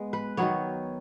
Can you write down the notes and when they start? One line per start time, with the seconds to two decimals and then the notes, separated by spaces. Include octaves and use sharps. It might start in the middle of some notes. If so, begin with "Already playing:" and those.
Already playing: G#3 B3
0.13 B4
0.37 D#3 F#3 B3 C#5